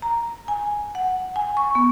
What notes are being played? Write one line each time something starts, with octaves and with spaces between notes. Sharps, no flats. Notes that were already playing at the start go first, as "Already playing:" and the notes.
A#5
G#5
F#5
G#5
C#6
B3